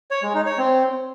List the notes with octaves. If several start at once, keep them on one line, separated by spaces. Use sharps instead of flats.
C#5
G#3
D#4
C#5
C4